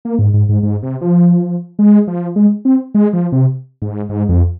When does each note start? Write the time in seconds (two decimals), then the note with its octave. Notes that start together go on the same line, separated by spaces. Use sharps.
0.05 A#3
0.19 G#2
0.34 G#2
0.49 G#2
0.63 G#2
0.83 C3
1.01 F3
1.79 G#3
2.07 F3
2.36 G#3
2.65 C4
2.95 G#3
3.13 F3
3.32 C3
3.82 G#2
4.10 G#2
4.29 F2